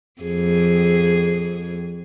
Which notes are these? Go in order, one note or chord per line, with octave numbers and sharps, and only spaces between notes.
F2 G#4